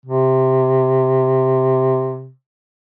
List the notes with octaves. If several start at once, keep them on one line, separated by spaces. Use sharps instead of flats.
C3